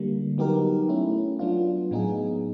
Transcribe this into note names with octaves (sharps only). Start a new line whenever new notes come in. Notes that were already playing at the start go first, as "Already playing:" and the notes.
Already playing: D3 G3 A#3
F#3 B3 D#4 G4 A#4
A3 C#4 E4
F#3 B3 D4 F4
A2 F#3 B3 D#4 G#4